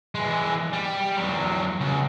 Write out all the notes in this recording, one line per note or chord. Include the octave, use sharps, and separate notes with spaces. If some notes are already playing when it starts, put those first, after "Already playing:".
E3 G#3
G3
E2 F#3
C#2